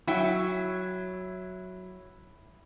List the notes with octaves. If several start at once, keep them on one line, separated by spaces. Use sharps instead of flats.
F#3 E4 E5 G5